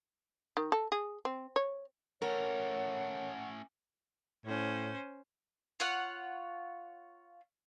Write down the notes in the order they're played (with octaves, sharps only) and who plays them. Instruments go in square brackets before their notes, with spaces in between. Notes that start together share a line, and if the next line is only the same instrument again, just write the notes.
[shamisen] D#3
A4
G#4
C4
C#5
[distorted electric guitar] A3 C#4 [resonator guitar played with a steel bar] A#4 [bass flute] C#5 [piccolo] F#5
[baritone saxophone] A2 [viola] C#4 C5
[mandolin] F4 C#5 F#5